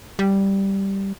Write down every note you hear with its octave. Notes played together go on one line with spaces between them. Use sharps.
G3